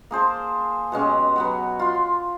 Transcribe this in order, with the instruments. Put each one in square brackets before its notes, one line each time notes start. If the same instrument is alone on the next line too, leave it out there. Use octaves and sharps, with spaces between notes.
[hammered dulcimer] A#3 G#4 C5 A5
B2 G#3 C#4 G4
F#3 B3 F#4
F4 C6